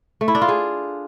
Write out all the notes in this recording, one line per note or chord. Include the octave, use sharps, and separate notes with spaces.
A3
E4
D4
F4
G#4